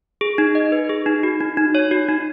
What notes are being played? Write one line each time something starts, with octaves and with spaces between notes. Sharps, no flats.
G#4
D#4
D#5
B4
G#4
D#4
F#4
D#4
D#4
C#5
F#4
D#4